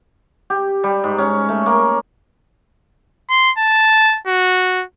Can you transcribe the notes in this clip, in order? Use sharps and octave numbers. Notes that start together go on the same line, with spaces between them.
G4
G3
G#2
C#4
A3
A#3
C6
A5
F#4